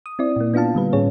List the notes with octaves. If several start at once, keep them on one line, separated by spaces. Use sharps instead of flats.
D#6
C4 E4 D5
A#2 A#3
B3 D4 F4 F5 A5
D3 G3 B4
A2 C#4 G#4 C#5